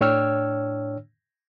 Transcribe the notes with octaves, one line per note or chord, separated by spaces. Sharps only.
A2 D4 C#5 G5 E6 F6